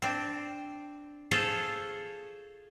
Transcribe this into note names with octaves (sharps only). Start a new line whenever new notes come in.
C4 D4
F4 G#4 A4 C5 C#5